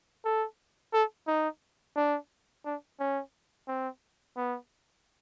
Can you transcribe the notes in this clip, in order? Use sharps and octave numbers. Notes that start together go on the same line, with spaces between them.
A4
A4
D#4
D4
D4
C#4
C4
B3